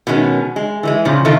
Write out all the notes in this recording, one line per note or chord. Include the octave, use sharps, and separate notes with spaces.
B2 D#3 G#3 A#3 C#4
G#3
E3 G3 G#3
A#2 C#3 F3
C3 D#3 D#4 F4 A4